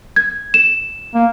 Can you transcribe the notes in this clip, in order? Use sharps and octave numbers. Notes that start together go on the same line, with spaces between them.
G#6
E7
A#3